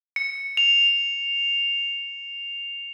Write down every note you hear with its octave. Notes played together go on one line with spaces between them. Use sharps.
C#7
F7